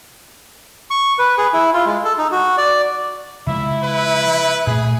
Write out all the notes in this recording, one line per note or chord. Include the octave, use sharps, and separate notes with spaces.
C#6
B4
G#4
E4
F4
G#3
A4
D#4
F#4
D5
C#3 F3 G#3 E4 E5
B4
A#2 A3 G#4